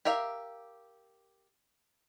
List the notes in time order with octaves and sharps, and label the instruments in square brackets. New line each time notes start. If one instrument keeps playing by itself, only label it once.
[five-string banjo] G4 A#4 E5 F5